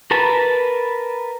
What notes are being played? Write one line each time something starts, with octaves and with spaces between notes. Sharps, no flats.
A#4 B4 A5 B5